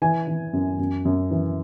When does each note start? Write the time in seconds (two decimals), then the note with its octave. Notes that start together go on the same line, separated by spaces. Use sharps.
0.02 E3 G#5
0.27 E3
0.53 F#2
0.79 F#2
1.05 F#2
1.31 E3